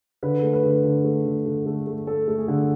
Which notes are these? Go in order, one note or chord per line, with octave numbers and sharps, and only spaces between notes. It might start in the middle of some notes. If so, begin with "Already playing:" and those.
D3 B4
A3
B4
D3
D3
A3
D3
D3
A3
A3
A3 A4
A3
G#4
D3